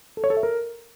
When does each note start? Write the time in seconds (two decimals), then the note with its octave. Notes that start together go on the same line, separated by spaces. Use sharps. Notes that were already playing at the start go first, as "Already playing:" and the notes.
0.17 A4
0.24 C#5
0.30 A4
0.37 E5
0.43 A#4